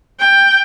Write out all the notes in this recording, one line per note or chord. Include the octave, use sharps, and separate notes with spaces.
G5